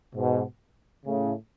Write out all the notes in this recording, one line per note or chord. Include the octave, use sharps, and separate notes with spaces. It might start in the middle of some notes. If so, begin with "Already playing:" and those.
G#2 B2
A2 C#3